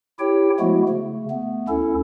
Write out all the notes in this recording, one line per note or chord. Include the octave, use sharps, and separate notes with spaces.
E4 G4 C#5 G5
F3 G#3 A3 B3 E4 F#4
C#3 A3
A3 B3
D2 C#4 E4 A4